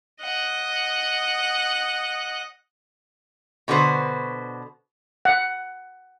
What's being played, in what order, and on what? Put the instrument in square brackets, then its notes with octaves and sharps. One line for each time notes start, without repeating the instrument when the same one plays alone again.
[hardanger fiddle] D#5 F#5
[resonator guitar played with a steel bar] B2 D3 F#4 B4 C5
[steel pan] F#5